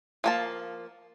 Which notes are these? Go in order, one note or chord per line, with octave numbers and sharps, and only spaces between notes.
F3 A#3 A5